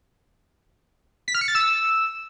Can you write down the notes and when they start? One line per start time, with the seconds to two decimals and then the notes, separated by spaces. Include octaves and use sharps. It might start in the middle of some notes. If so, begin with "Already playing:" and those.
1.28 B6
1.35 F6
1.41 C#7
1.48 A6
1.55 E6